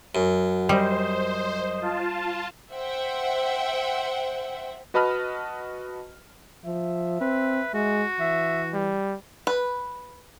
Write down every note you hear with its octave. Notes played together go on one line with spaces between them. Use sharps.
F#2 F#4
G3 C5 D#5
F4 A5
C5 E5 F#5 G5
F#4 B4 D#5 A5 B5 F6
F3 E5
C4 B4
G#3 F#4
E3 E5
G3
B4